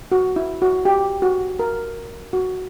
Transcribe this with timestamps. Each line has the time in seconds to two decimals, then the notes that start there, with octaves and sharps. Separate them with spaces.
0.12 F#4
0.36 E4
0.62 F#4
0.85 G4
1.22 F#4
1.59 A#4
2.33 F#4